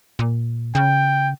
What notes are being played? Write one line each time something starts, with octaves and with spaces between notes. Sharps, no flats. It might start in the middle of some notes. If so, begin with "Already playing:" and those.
A#2
C#3 G5